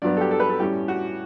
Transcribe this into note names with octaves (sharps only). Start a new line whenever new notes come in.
G2 F#3 B3 D5
A4
G4
A4
B4
A4
A2 G3 C#4 G4
F#4